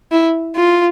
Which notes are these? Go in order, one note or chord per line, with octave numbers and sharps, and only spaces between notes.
E4
F4